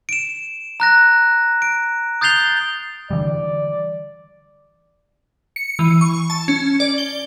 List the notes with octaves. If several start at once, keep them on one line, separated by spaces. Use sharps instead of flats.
D7 E7
A#5 F#6 A#6
D7
D#6 G6 A6 C7 F7 G7
D3 E3 G3 D5
C#7
E3
C#6
A5
C#4
D5
G7